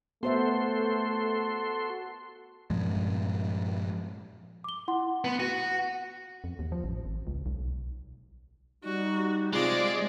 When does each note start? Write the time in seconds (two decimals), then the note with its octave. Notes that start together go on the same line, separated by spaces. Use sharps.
0.23 A3 B3 F#4 A4 C5 E5 C6
2.70 G2 A#2 F3 G#3
4.64 D6 G7
4.88 E4 F#5 C6
5.25 B3
5.40 F#4 D#7
6.44 F2
6.59 D#2
6.72 F3
6.84 A1
7.05 G#1
7.27 C#2
7.46 B1
8.84 G3 D#4 F#4
9.53 C3 G#3 C4 F4 D5